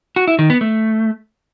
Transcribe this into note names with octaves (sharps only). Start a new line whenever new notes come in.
F#4
E4
D#3
B3
A3